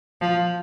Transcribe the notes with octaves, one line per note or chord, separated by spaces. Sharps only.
F3